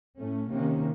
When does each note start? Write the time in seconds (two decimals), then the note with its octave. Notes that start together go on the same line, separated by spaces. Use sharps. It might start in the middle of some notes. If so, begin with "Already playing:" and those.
0.17 A2 A3 C#4
0.51 C3 D#3 A#3 C#4